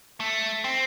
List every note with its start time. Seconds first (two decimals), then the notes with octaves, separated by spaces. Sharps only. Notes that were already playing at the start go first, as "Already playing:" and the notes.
0.20 A3
0.64 C4